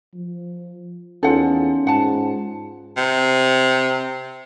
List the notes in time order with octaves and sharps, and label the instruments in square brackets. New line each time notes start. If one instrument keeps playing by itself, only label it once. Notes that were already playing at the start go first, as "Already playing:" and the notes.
[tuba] F3
[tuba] E2 [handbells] C#4 D#4 F4 [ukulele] A4 F#5
[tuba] G#2 [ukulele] F#5 A5
[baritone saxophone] C3